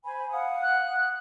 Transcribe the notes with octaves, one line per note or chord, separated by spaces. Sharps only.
C5 G#5 B5
F5 F#5 D#6
F#6